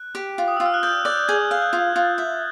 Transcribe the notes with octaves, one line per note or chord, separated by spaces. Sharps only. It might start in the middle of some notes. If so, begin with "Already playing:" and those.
Already playing: F#6
G4
F4
D#6
F4 E6
F6
F#6
D5 G6
D5
G#4 G#6
F5
F#6
F4 G6
F4 A6
E5